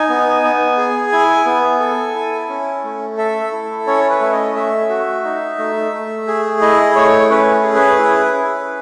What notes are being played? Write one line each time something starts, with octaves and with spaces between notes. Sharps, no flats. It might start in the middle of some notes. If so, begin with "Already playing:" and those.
Already playing: D#4 G#5
B3
B3
G#4
E4 G#5
B3
A4
E4
C#4
A3
A4 E5
E4
C#4 C#5
B4
A3 E5
D#5
A3 E5
F#4
D#4
A3
A3
G#4
E4 D#5
A3 C#5
C#4 B4
G#4
B4
E4
C#4